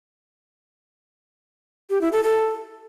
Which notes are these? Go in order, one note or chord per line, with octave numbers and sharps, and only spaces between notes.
G4
E4
A4
A4